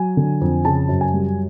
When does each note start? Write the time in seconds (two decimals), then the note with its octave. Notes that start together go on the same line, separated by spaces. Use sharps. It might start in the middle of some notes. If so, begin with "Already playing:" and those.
Already playing: F#3 G#5
0.17 D3
0.41 F2
0.65 C#3 A5
0.89 F#2
1.01 G#5
1.13 G3